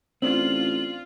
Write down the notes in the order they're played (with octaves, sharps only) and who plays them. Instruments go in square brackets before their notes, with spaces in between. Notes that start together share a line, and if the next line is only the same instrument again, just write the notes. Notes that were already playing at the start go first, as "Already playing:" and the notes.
[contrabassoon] A1 [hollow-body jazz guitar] C4 D4 [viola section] F4 [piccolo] F#7